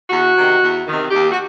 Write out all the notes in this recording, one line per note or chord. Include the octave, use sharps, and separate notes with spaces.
E2 F#4
C3 D#3
E2
C3 D#3
D#2 G4
F#4